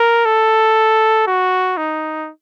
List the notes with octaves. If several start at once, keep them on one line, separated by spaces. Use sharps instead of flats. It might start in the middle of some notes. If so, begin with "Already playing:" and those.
Already playing: A#4
A4
F#4
D#4